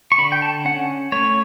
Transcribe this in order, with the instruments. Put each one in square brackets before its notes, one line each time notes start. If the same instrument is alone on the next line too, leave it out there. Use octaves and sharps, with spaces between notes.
[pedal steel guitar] C#6
D3 B5
G5
A5
C#4 F#5
A3 C#5